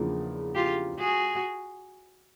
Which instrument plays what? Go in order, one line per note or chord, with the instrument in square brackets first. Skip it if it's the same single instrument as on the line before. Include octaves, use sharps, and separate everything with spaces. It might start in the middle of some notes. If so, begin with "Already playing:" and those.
Already playing: [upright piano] E2 C#3 F3 A#3 D4
[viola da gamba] F4 G4
F#4 G#4